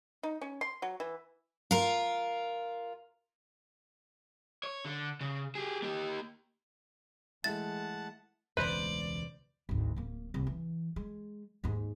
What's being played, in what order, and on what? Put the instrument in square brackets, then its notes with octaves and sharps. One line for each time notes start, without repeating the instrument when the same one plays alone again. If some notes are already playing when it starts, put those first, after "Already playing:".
[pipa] D#4
C#4
C6
F#3
E3
[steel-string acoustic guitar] F4 A#4
[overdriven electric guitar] C#5
D3
C#3
G4 G#4
A#3 G4
[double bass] E3 G#3 [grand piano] A3 E4 E5 [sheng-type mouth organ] F#5 A5 [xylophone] A6
[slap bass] E1 C#2 [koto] B4 [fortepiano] C5 [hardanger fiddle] D5
[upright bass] G#1 D2
D1 A#3
C2
E3
G#3
D#2 G#2